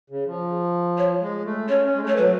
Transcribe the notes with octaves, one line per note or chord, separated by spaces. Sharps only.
C#3
F3
C#5
G#3
A3
C#4 C#5
C#4
G#3
A3
C#5
F#3 B4